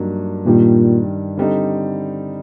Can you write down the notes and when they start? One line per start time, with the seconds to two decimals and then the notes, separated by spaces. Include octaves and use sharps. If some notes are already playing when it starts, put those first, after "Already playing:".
Already playing: G2 F#3 A#3 D#4
0.46 G2 A#2 D#3 G3
1.37 D3 G3 C4 D#4